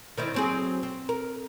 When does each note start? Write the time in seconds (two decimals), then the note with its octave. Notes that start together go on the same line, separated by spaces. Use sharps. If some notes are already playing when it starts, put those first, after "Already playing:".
0.18 D#3 C4 E4
0.34 F#3 C4 G#4
0.83 C4
1.09 A#4